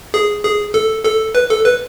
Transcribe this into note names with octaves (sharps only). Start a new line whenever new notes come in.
G#4
G#4
A4
A4
B4
A4
B4